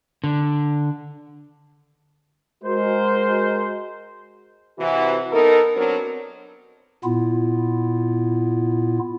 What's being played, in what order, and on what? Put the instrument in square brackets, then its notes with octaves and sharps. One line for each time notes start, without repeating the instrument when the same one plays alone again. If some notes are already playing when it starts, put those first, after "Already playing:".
[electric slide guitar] D3
[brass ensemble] G#3 F#4 A#4 C5
[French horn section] C3 E3 F#4
B3 D#4 A4 A#4
F#3 B3 C4 D4 A#4 C5
[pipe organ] A#2 B3 E4 F4